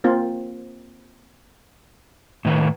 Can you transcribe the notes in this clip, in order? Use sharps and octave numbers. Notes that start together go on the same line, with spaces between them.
A#3 C4 F4
A2 D#3 B4